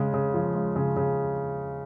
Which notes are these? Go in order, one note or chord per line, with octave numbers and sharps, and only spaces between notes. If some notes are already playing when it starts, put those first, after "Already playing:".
Already playing: C#3 G#3
C#3
F3
G#3
C#3
C#3